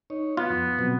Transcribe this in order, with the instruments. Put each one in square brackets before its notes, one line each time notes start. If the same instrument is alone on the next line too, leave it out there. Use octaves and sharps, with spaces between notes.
[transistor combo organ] D#4 C#5
[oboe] B3 [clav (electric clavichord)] F4
[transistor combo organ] F2
B2 F#3 C4